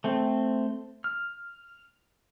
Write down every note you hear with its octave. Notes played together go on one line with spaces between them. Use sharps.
A3 C4
F6